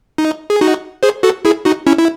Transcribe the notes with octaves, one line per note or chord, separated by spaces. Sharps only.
D#4
G#4
D#4 F#4
G#4 C5
F#4 A4
E4 G#4
D#4 F#4
C#4 E4
E4